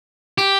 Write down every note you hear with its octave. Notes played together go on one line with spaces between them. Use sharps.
G4